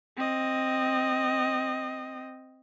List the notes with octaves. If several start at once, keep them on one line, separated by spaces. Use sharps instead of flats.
C4 D#5